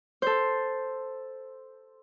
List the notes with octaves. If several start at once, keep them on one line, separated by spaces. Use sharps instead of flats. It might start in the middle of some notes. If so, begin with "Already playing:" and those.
A4 C5